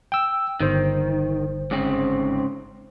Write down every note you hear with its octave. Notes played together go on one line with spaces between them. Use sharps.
G5 E6
G1 D#3 C5
G#2 C#3 C4